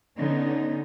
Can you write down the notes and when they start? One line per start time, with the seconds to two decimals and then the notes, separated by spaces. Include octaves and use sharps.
0.17 D3 B3 C#4 D#4